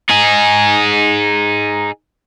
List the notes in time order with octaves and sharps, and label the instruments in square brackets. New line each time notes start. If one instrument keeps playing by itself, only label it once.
[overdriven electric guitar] D#4 G#4